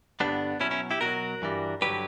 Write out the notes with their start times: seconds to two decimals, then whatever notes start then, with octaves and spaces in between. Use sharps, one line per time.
0.20 G2 D3 G3 B3 D4
0.60 B2 F#3 C#4 E4
0.71 C#4 E4
0.91 E4 G4
1.01 B2 F#3 F#4 A#4
1.42 G2 E3 G3
1.81 G2 D3 F#3 G4 B4